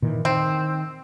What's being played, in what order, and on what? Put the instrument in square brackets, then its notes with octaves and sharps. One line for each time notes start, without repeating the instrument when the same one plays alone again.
[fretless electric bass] A#2 D#3 E3
[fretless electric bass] D#3 [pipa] C4